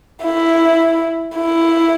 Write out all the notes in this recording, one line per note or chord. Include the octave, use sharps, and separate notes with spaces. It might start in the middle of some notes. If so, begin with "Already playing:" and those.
E4
E4